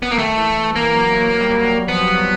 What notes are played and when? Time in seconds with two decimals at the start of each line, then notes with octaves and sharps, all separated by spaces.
0.03 B3
0.11 A#3
0.18 D#3 A3
0.37 E3
0.76 E3 A#3
0.95 F#3
1.13 F#3
1.33 F#3
1.41 G3
1.50 F#3
1.88 F3 B3
2.07 F#3